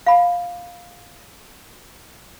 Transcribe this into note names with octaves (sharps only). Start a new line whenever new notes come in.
F5 B5